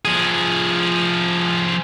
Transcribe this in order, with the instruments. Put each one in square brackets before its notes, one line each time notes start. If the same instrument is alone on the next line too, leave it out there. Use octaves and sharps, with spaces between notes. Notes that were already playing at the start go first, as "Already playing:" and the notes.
[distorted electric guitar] F3 G#4